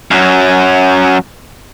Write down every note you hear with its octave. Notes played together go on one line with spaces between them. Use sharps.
F#2 F#3